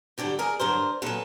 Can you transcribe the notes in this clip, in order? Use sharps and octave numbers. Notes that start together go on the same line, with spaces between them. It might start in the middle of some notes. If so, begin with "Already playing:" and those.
G2 D3 F#3 G4 A4
G#4 A#4
G2 D3 F#3 A#4 C5
A#2 F#3 A4 B4